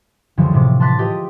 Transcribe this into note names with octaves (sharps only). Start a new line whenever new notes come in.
C#2 F#2 D3 E3 F3 G3
A2 C3 D6
A5 C6 D6 F#6 A6 B6
F4 G4 G#4 B4 D#5
D7